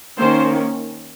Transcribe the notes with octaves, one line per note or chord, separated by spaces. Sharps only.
D#3 A#3 C#4 C5